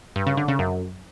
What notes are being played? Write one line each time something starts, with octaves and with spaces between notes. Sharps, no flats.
G2
C#3
D3
C#3
F#2